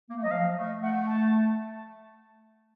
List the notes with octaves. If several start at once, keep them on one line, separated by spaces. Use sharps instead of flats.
A#3
A3
F#3 D#5
F3 F5
A3
A3 F#5
A5